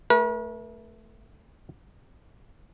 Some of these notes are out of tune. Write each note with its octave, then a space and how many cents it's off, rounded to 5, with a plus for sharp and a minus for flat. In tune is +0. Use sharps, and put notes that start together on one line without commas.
A3 +0 B4 -45